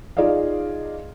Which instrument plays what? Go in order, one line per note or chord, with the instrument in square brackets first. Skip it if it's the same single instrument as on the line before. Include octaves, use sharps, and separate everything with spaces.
[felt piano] D#4 F4 G#4 D5 D#5 F5